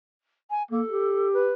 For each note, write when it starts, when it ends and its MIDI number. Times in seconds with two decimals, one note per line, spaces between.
0.50 0.63 80
0.71 0.82 58
0.71 1.32 69
0.89 1.53 67
1.33 1.53 71